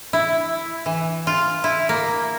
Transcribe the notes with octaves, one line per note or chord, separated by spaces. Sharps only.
E4
E3
F4
E4
A#3